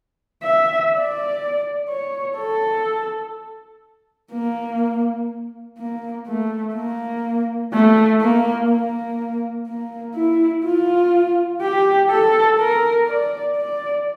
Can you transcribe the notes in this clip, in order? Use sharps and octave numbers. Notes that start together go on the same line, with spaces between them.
E5
D5
C#5
A4
A#3
A#3
A3
A#3
A3
A#3
A#3
A#3
E4
F4
G4
A4
A#4
D5
D5